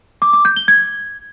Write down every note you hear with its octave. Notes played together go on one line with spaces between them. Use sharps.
D6
D6
G6
G7
G#6